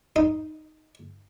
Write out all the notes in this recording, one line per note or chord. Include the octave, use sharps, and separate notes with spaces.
D#4